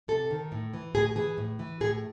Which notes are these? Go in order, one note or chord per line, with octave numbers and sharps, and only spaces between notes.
C3 A4
D#3
A2
E3
A2 G#4
E3 G#4
A2
E3
A2 G#4